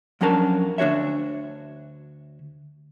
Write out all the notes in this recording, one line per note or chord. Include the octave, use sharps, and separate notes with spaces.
F2 F#3 C#4 D4 A#4 A5
D2 D4 F#4 C#5 E5